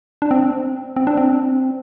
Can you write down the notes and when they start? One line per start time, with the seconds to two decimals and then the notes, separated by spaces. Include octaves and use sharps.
0.22 D4
0.31 C4
0.96 C4
1.07 D4
1.17 C4